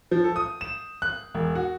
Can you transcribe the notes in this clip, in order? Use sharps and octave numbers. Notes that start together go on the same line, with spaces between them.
F3
A4
D#6
E7
F#6
E1
F#4